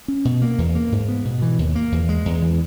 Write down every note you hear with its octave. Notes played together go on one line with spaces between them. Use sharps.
C#4
B2
A#3
E2
A#3
G#2
B3
B2
E3
D#2
A#3
E2
G#3
E2
E3